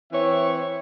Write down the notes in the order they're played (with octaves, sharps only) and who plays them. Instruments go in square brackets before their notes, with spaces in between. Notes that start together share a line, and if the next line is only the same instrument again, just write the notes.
[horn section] E3 C4 C#5 E5